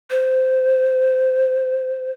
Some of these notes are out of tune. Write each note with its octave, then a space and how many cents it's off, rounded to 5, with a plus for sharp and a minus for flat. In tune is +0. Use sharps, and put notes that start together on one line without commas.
C5 -15